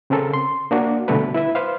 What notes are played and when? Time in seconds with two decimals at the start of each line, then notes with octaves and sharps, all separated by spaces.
0.10 C#3 C4 C#4 A4 A#4
0.34 C6
0.71 A#3 D4 F#4
1.08 B2 D3 G3 A3 A4 B4
1.34 E4 B4 E5
1.55 B4 C5 F5